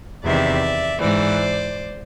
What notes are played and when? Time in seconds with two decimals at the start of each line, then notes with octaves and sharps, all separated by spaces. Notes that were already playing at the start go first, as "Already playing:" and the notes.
0.25 E2 C3 D#3 D5 E5
1.00 G#2 E3 C5 D5